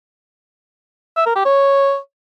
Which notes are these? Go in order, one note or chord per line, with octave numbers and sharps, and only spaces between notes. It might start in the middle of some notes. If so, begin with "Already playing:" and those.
E5
A#4
G4
C#5